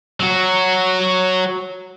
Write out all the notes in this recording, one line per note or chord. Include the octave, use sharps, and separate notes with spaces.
F#3 F#4